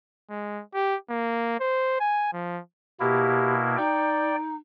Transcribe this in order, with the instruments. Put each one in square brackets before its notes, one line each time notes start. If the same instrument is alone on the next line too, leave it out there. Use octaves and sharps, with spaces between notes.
[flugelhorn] G#3
G4
A#3
C5
G#5
F3
[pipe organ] B2 A#3 E4 [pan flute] G4
[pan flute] D#4 [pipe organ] D5 G5